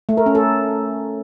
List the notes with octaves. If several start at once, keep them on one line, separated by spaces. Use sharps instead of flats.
A3
A#4
C#4
A4